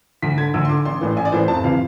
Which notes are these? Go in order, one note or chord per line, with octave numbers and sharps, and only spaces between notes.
D2 B6
D3 G#6
D2 E6
C6
D3 D6
A1 C6
A2 E3
A1 G#5
D5
A2 E3 C5
F1 A5
C3 E3 F5